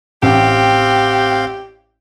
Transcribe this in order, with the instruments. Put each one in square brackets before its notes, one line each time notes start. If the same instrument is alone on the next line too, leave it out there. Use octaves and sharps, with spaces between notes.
[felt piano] A1 [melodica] C4 F5 [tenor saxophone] G4